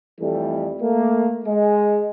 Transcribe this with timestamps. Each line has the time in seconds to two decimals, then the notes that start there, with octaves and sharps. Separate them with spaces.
0.19 F2 E3 G3 A3
0.80 A3 A#3
1.45 G#3